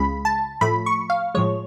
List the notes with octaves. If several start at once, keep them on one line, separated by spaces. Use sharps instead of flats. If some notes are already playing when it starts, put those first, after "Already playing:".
Already playing: C#2 C#3 G#3 B5
A5
A2 F3 A3 B5
C#6
F5
A2 F3 G#3 C#5